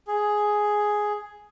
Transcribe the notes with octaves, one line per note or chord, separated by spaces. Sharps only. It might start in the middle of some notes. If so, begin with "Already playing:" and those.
G#4